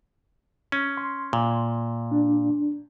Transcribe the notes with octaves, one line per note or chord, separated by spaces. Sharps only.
C#4
C6
A#2
D4